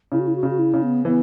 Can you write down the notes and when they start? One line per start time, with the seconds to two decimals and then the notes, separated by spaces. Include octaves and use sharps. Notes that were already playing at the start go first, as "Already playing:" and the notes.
0.12 C#3 E4
0.19 F#4
0.27 E4
0.35 F#4
0.43 C#3
0.50 F#4
0.58 E4
0.74 C#3
0.82 B3
1.05 E3 B3